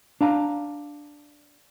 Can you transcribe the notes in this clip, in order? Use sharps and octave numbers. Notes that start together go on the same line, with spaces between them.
D4 F5 A#5